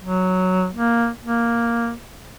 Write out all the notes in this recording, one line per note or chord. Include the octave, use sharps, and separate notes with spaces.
F#3
A#3
A#3